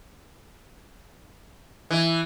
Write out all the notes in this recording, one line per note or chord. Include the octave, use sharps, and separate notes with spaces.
E3